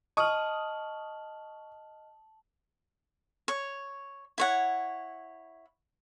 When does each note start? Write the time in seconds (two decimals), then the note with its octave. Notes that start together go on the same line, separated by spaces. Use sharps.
0.17 D#5 A5 C#6 D#6 F6 F#7
3.48 C#5
4.38 E4 C#5 F#5